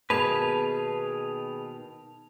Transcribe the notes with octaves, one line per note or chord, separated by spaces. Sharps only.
B2 D#3 A#3 G#4 B4 A5 F7